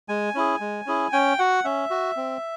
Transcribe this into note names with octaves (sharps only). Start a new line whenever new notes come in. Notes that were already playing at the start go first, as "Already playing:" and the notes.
G#3 G#5
C#4 E4 G#4
G#3
C#4 E4 G#4
C#4 G5
F#4 F#5
C#4 E5
F#4
C4